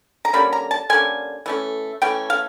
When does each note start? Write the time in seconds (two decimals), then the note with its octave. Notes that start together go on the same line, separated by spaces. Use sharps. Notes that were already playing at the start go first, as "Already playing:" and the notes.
0.25 A#5
0.33 D3 G3 A#3 C#4 B5
0.53 A#5
0.71 A5
0.90 D3 G3 A#3 C#4 G#5
1.46 E3 A3 C#4
2.02 E3 A3 C#4 G5
2.30 F5